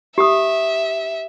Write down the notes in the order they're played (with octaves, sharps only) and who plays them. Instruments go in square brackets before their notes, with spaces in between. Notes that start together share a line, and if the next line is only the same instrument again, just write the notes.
[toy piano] G4 D#6 [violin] E5